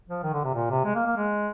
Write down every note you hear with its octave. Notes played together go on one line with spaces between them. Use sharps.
F3
D#3
D3
C3
A#2
C3
G#3
A#3
A#3
G#3